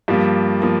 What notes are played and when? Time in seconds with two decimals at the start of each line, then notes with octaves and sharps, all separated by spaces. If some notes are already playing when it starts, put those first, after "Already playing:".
0.08 G2 F3 A#3 G4
0.62 F3 A#3